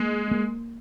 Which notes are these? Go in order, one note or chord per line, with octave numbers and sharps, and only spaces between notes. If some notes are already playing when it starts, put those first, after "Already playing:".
Already playing: G#3 A#3
A#3